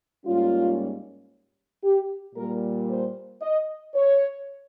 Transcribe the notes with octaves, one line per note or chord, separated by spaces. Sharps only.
G#2 G3 A#3 C#4 F4
G4
A#2 G3 A#3 A#4
C5
D#5
C#5